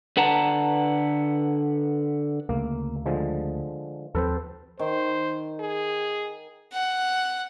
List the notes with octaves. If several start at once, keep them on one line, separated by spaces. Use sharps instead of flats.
D3 B4 F#5 A5 A#5
D2 C#3 A3 A#3
D3 F3 G#3
D#2 F3 C4 A4 B4 C5
D#3 C5
G#4
F#5